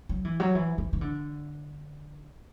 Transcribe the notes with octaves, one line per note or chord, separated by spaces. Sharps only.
F#3
E3
F#3
E3
E3
E3
D3